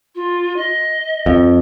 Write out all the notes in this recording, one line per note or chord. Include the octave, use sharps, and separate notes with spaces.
F4
D#5
F2